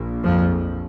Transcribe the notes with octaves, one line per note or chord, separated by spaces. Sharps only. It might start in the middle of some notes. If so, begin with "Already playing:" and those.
Already playing: A#1 A#2
F2 F3